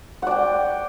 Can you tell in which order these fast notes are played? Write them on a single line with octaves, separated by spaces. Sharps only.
F#5 D5 G5